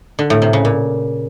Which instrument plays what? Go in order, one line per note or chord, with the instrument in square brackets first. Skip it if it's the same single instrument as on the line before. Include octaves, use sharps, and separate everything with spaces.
[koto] D3
A2
C3
C#3
A#2